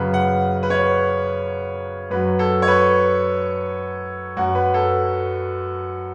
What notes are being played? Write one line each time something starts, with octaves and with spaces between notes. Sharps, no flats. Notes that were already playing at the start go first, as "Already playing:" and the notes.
Already playing: F#2 C#3 F#3 B4
F#5
B4
C#5
F#2 F#3 B4
A4
C#5
B4
F#2 F#3 F#4
B4
A4